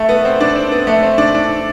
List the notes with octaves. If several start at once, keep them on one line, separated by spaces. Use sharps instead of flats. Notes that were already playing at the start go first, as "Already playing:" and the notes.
Already playing: A3
B3
C4
D4
C4
B3
A3
C4
D4
D4